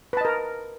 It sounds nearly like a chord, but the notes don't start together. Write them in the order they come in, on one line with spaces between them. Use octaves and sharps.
B4 A5 D#5 A#4